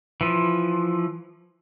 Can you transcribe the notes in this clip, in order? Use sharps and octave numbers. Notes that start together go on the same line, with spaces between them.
E3 F3